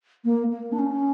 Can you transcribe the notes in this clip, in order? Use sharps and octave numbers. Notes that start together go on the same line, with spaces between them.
A#3
A#3
D4
C#4